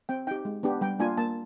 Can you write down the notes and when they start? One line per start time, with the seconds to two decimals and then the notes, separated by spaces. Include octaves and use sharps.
0.09 C4 G5
0.27 D#4 G4 G5
0.45 G#3
0.63 B3 D4 G4
0.81 G3 G5
0.99 A#3 D4 F4 G#5
1.17 A#3 A5